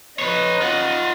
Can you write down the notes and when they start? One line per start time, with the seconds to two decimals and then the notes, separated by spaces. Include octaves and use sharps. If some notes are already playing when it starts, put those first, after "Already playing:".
0.19 B4 C#5 D#5
0.61 F4 F#5